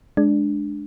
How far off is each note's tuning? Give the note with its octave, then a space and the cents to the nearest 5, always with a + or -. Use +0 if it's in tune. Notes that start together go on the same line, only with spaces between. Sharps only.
G#3 +10 D4 +0